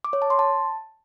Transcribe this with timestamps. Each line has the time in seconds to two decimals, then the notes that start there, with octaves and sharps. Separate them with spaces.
0.04 D6
0.13 C#5
0.22 A5
0.30 C6
0.39 A5